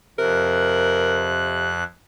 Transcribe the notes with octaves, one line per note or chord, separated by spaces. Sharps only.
F2 C3 A#4 F#6